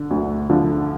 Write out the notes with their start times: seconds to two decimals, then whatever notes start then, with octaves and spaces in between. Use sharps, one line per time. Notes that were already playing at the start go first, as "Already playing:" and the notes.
Already playing: D3
0.11 D2
0.50 D3 F3